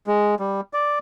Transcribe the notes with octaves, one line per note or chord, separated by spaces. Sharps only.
G#3
G3
D5